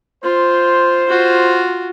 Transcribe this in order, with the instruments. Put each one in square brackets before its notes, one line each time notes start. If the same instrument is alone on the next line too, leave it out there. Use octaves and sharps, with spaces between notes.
[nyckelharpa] F4 [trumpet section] C5
[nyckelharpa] F4 F#4